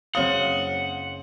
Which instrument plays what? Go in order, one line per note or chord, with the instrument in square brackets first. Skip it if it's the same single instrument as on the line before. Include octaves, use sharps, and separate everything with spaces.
[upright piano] F#1 C4 D#6 [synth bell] C#5 F5 [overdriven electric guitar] F#5